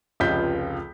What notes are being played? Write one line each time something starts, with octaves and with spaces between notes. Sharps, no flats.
F1 C#2 F4 G6 B6